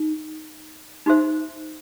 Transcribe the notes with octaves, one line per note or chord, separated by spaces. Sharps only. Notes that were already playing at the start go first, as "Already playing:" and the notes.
Already playing: D#4
D#4 F#4 C5 E5